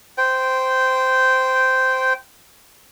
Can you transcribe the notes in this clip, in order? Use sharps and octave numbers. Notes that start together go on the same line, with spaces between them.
C5 G5